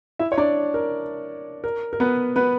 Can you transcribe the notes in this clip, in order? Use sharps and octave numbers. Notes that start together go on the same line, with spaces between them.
E4 E5
C#5
D4 D5
A#4
A#4
A#4
B3 B4
B3 B4